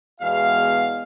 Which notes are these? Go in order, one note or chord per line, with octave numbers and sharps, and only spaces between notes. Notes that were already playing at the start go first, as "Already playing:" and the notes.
E2 B2 G#3 F5